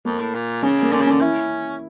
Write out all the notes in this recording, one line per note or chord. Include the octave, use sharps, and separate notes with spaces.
F2 A#3
A2
A#2
C#3 C#4
A#3
D3 C#4
C#3
D3 C#4
C#4 E4